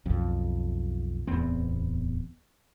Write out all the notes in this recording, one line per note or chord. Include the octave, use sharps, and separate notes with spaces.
B1 F2
D1 E2 B3 C4